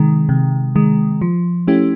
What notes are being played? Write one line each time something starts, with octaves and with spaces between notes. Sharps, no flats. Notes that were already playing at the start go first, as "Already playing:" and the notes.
Already playing: C3 D#3 G#3
C3
D#3 G#3
F3
A3 C#4 E4 G4